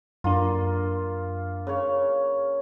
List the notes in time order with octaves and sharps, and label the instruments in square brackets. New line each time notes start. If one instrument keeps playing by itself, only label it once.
[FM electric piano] F#2 D4 [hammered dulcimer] A#3 F4
[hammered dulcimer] C#3 C#5